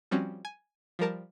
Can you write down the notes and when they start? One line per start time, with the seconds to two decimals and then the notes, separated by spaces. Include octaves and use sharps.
0.11 F3 G3 C4 C#4 F#4
0.45 G#5
0.99 F3 G3 A#4 A5